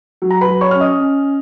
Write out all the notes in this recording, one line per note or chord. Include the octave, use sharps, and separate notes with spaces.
F#3
A#5
B4 B5
F#3
C#5 C#6
C#4 F6
D#5 D#6
C#4